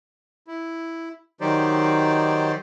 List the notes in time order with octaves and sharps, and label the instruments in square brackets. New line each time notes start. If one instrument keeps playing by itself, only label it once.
[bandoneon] E4
D#3 F#3 D#4 G4 C5 D5